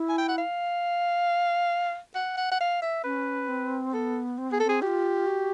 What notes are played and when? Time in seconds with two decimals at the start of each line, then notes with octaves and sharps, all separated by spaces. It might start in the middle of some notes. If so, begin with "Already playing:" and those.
Already playing: E4
0.09 G#5
0.18 G5
0.28 F#5
0.38 F5
2.15 F#5
2.37 F#5
2.51 F#5
2.60 F5
2.82 E5
3.04 C#4 B4
3.48 C4
3.93 B3 A4
4.38 C4
4.51 B3 G#4
4.60 A4
4.64 C4 G#4
4.81 F#4 G4
4.87 F4
5.27 F#4